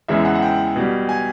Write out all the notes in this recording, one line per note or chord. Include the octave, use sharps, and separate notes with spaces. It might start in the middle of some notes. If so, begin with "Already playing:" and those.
E2 C#3 E3 G#3 E5
F#5
F#5
G5
B2 G3
G#5